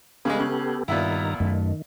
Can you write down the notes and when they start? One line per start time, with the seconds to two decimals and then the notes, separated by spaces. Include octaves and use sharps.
0.25 C#3 G3 G#3 B3 G4 A4
0.40 C#3
0.88 G2 A#2 D#3 B3 E4 A#5
1.40 F#2 D#3 A3